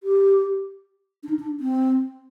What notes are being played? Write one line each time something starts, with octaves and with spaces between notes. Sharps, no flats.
G4
D4
D#4
D4
C4